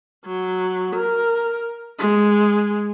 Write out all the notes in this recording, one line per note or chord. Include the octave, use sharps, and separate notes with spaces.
F#3
A#4
G#3